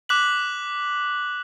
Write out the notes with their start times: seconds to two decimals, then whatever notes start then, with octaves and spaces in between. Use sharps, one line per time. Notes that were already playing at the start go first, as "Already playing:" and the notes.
0.09 D6 F#6 B6 F#7